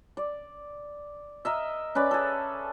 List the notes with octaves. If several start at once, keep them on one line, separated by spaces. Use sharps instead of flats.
D5
A#4 D#5 E5
C#4 B4 D5
G#4 A4